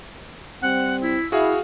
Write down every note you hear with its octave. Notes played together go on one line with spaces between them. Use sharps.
G3 C4 F#5
E4 E6
E4 F#4 G#4 F5